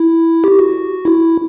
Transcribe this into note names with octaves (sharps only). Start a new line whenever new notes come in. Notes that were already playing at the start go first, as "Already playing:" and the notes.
Already playing: E4
G4
F#4
E4